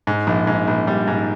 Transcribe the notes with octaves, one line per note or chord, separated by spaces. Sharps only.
G#2
A#1
G#2
A#1
G3
G#2